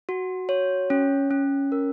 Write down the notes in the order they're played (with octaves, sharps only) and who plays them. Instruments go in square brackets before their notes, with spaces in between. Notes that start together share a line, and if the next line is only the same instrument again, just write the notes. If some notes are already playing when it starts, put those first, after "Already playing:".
[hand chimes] F#4
C#5
C#4
C#4
A#4